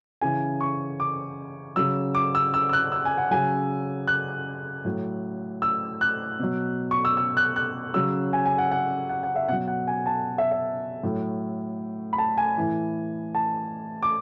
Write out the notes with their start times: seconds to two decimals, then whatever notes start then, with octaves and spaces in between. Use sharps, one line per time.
0.21 C#3 E3 G#5
0.61 C#6
1.00 D6
1.76 C#3 F#3 E6
2.15 D6
2.35 E6
2.54 E6
2.69 E6
2.73 F#6
2.92 E6
3.05 G#5
3.18 F#5
3.31 C#3 F#3 G#5
4.08 F#6
4.85 A2 F#3
5.62 E6
6.01 F#6
6.39 B2 F#3
6.91 C#6
7.05 E6
7.17 E6
7.37 F#6
7.56 F#6
7.94 C#3 F#3 E6
8.33 G#5
8.46 G#5
8.58 F#5
8.72 F#5
9.10 F#5
9.23 F#5
9.36 E5
9.48 B2 F#5
9.52 F#3
9.68 F#5
9.88 G#5
10.06 A5
10.38 E5
10.51 E5
11.03 A2 F#3
12.13 B5
12.18 A5
12.38 G#5
12.57 A2 E3
13.35 A5
14.03 D6